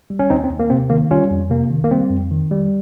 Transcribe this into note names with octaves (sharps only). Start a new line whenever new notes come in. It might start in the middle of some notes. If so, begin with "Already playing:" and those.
G3
C#4
D#2 C4 D#4
C4
D#2
A#3
C3 C4
D#3 A#3
G3 C#4 F4
F2
C3 A#3
D#3
A#3
G3 C4
F2
D#3
G3